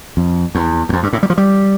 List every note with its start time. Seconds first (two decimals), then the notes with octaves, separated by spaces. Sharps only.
0.17 F2
0.55 E2
0.89 E2
0.93 F2
1.03 G2
1.13 A2
1.23 G3
1.30 F3
1.38 G3